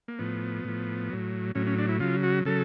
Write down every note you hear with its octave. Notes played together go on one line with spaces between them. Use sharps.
A#3
A2 F3 B3
A2 F3
A2 F#3
A2 F#3 C#4
C#4
D4
E4
C#3 F#3 F4
F#4
C#3 F#3 A4